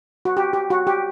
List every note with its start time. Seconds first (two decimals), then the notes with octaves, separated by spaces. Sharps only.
0.25 F#4
0.37 G4
0.53 G4
0.70 F#4
0.87 G4